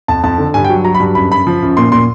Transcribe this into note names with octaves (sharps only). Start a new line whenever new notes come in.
F2 A5
F2 A5
D3
G2 G#5
G5
F#3
F#3 A#5
B5
G2
F#2 B5
F#2 B5
F3
F#2
A#2 C6
A#2 C6